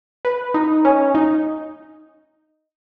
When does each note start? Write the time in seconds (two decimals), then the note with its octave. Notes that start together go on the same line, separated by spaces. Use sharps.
0.25 B4
0.54 D#4
0.85 C#4
1.15 D#4